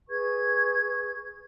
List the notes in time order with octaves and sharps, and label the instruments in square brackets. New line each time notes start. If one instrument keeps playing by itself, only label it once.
[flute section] G#4 B4 C#6 G#6